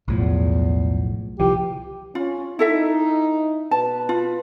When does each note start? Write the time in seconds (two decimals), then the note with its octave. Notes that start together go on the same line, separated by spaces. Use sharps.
0.08 B1 E2 A2 F3
1.40 C2 E3 F3 G4
2.15 C#4 F4
2.59 D#4 E4 A4 E5
3.71 B2 B4 A5
4.09 F4